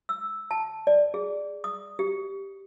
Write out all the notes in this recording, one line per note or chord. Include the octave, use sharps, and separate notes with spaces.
E6
A5
D5
G#4
D#6
G4